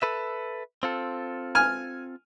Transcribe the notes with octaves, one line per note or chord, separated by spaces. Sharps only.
A4 B4 E5
C4 F4 A4
G#5 F6